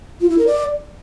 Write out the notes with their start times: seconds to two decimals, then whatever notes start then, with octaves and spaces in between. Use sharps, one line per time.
0.21 F4
0.30 E4
0.38 A#4
0.47 D5